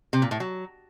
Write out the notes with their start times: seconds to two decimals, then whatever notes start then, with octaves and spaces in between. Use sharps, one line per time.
0.13 C3
0.22 A#2
0.31 A2
0.40 F#3